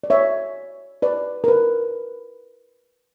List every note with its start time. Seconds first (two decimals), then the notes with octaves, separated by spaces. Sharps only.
0.04 D5
0.10 C#5 E5
1.02 B4 D5
1.44 A#4
1.48 B4